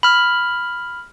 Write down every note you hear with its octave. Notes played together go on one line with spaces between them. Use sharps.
B5 F6